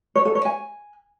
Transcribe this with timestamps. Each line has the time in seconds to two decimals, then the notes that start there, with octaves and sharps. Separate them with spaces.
0.15 C#5
0.25 A4
0.35 C#5
0.45 G#5